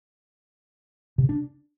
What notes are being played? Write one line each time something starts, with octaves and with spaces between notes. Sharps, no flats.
C3
C#3
D4